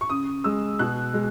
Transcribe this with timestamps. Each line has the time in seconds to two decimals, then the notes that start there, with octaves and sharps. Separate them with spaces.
0.01 C#6
0.09 C#3 D#6
0.44 G#3 E6
0.79 B2 F#6
1.14 G#3